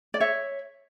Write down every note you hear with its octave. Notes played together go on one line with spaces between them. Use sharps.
D5
C#5 E5